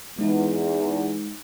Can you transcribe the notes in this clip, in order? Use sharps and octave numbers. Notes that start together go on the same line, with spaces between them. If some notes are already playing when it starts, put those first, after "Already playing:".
E2 G#3 D#4